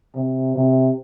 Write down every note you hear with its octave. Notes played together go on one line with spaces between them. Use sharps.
C3
C3